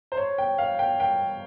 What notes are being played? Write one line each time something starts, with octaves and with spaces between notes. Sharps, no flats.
C5
C#5
G5
F5
G5
G5